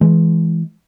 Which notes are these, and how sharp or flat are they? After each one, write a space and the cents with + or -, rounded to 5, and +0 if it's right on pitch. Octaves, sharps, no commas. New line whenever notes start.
E3 +0 G#3 +20